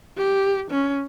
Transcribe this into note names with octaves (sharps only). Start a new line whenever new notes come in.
G4
C#4